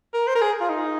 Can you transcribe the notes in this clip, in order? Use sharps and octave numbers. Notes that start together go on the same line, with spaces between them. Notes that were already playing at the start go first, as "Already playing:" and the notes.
A#4
C5
A#4
G#4
F4
D#4